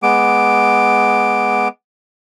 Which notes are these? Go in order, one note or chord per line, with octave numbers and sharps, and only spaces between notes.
G#3 B3 D6